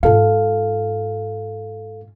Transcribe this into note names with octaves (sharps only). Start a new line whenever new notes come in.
G#2 F4 A4 F5